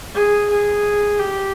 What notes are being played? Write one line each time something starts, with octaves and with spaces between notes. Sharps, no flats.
G#4
G#4
G4